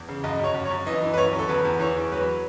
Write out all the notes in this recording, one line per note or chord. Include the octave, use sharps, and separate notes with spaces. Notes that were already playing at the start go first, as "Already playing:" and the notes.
Already playing: E2
C#3
F#2 D#5
F#2 C#5
F#2
C#5
F#2
E3 D#5
E3
B4
F#2 C#5
F#2
A4
E2 B4
E2
E3 C#5
E2
F#3 B4